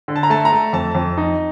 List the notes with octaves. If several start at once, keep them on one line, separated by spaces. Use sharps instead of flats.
D3
A5
A#5
A3 A5
A#5
A3
F2 A5
F2
D#4